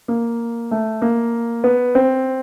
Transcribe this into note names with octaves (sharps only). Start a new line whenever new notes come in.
A#3
A3
A#3
B3
C4